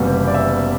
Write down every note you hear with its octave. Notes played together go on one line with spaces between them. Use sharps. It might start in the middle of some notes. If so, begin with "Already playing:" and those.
Already playing: F#1 E2 C3 G3 B3
D5
E5